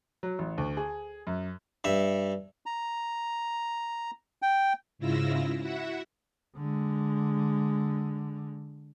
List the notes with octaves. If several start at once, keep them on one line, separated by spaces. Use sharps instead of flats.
F#3
A1
D2
G#4
F#2
G2 E5
A#5
G5
G#2 C#3 E4 F4 E6 A#6
E4 F#4 E5 F#5
D3 G#3